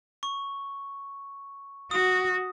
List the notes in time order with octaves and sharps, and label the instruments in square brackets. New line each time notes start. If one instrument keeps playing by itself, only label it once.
[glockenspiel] C#6
[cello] F#4 [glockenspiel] D#6